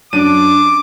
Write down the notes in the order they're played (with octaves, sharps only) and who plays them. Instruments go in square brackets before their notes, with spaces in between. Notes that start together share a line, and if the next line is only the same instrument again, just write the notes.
[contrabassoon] F#2 [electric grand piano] D4 D#7 [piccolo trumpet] D6